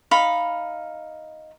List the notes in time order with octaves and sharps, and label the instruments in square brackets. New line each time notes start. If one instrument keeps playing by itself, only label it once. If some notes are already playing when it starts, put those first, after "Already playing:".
[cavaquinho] D#4 F5 B5